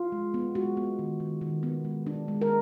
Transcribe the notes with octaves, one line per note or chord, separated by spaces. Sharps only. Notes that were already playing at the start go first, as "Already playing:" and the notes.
Already playing: F4
G#3
B3
G#3 F#4
B3
D#3
D#3
D#3
B3
G#3
D4
G#3
A#4